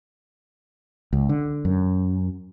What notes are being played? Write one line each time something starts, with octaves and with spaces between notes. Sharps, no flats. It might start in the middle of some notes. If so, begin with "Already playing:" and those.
C#2
D3
F#2